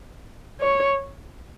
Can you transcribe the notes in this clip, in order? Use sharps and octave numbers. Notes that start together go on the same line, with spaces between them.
C#5